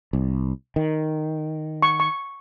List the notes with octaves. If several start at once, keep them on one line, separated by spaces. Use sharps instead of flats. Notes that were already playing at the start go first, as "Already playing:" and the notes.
C2
D#3
C#6
C#6